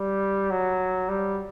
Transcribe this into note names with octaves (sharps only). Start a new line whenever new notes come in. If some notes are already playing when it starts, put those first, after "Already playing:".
Already playing: G3
F#3
G3